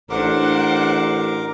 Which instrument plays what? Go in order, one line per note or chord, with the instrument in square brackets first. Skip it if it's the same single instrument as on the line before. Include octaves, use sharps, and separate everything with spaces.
[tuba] A1 [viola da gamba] D4 C5 [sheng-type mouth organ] A#4 D6 [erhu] F#5